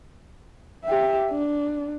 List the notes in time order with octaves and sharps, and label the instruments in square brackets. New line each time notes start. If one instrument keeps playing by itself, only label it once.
[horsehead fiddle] G4 E5
D4